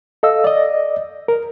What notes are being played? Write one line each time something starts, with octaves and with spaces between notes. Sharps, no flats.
A4 D#5 F5 E6
D5 D#5
A#4